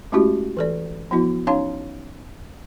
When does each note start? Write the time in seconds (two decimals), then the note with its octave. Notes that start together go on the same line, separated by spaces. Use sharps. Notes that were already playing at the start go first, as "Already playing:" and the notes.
0.12 G#3 A3 C#4 E4 F#4 G4
0.57 E3 A4 D5
1.11 F3 B3 E4 F#4
1.47 C#4 D#4 C#5 F5 A5 C6